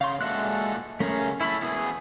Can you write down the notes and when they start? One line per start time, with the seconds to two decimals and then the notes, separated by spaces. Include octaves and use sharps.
0.01 C#3 F5 C6
0.21 A#2 G#3 F#4 A4 E5 F#6
1.00 F#2 C#3 A3 C#4 G#4 A#4
1.41 C#4 E4 A4 B5
1.62 E2 B2 E3 G#4